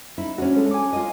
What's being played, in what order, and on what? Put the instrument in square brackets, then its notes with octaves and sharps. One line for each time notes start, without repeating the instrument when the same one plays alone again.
[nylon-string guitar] D#4 E4
[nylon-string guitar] C#4 D4 [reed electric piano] F#4
[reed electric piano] G#3 A4
G#5 D6
[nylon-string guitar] F4 D#5